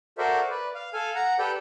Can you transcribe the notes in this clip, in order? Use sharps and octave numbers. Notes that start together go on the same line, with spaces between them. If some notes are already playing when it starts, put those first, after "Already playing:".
F#4 A4 A#4 C5 D5 E5
B4 D5
F5
A4 F5 G#5
F#5 A#5
G4 A4 B4 D5 G5